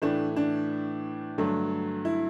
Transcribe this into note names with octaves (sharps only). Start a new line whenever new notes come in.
A2 E3 A3 D4
D4
G2 D3 F#3 A3
E4